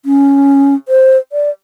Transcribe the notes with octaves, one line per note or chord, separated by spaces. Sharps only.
C#4
C5
D5